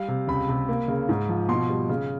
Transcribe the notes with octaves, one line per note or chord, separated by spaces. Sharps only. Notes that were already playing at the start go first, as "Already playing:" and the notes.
Already playing: G3 F5
C3
C#2 B5
C3
A#3
C#3
G#2
F3
B2 C6
G3
C#3